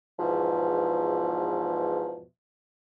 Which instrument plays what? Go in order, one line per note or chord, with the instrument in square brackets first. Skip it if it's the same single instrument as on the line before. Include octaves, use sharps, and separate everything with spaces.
[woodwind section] E2 G#2 B2 F3